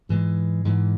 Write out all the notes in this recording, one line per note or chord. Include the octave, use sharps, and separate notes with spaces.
G#2 E3 G#3
G#2 E3 G#3